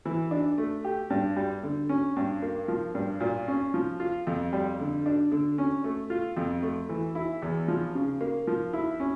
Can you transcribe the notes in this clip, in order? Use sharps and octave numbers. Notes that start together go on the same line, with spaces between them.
E3
D4
A3
G4
G2
G3
D3
C#4
G2
A#3
F3
G2
A#2
C#4
F3
F4
F2
G3
D3
D4
D3
C#4
A3
F4
F2
A3
E3
E4
E2
F3
C#3
A#3
F3
E4
C#4